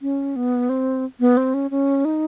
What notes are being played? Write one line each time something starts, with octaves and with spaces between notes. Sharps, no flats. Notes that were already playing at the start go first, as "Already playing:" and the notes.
C#4
B3
C4
B3
C4
C#4
C#4
D#4